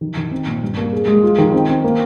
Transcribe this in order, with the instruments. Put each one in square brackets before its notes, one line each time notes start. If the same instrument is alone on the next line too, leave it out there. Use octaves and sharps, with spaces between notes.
[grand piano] D#3
D#3
C4
A#2
G2
A#3
G#4
G#3
F4
D#3
C4
C4
A#3